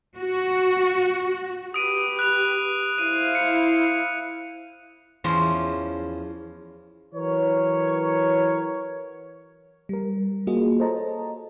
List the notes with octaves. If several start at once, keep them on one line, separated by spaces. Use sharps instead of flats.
F#4
G4 B4 D#6 D7 D#7
F#6 F7
E4 C5 F5 D#7
C#7
E2 F3 C#4 C6
E3 F#3 A#4 B4 C#5
G3 A#4
A#3 F4 F#4 G#4 D#5
A4 C5 C#5 D#5 A5 A#5